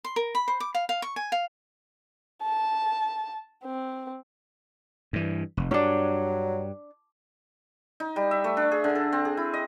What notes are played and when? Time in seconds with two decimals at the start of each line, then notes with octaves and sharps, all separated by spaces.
0.05 C6
0.16 A#4
0.35 B5
0.48 C5
0.60 D6
0.75 F5
0.89 F5
1.02 C#6
1.16 G#5
1.32 F5
2.42 A5
3.64 C4
5.13 G2 E3
5.57 F1
5.71 G2 F#3 C#4 D4
8.00 D#4
8.16 G3
8.31 E5
8.44 A3
8.57 D4
8.72 G#4
8.84 D3
8.95 A4
9.12 C4
9.25 G#4
9.37 E4
9.54 D#5